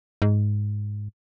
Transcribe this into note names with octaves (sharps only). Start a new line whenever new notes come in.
G#2